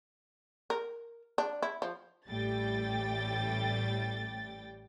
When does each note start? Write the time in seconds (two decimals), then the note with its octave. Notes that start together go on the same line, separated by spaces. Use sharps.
0.70 A#4
1.38 D4
1.62 E4
1.82 F3
2.29 A1 A2 G3 G5 A6